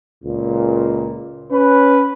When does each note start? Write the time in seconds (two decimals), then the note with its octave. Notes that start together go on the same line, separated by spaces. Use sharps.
0.24 C#2 A#2
1.52 C#4 B4